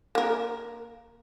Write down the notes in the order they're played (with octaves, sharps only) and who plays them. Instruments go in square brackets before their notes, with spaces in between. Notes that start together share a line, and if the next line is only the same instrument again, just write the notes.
[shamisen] A#3 A#4